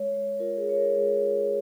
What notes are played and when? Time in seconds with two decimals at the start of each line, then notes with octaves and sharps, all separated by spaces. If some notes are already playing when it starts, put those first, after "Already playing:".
Already playing: G#3 C#5
0.12 G#3
0.39 F4 A#4
0.57 G#4
0.67 F4 C#5
0.76 A#4
0.95 G#3 G#4
1.23 F4